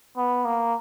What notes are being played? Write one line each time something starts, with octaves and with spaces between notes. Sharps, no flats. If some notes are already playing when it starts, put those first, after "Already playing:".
B3
A#3